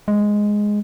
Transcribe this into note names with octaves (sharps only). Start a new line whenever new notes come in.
G#3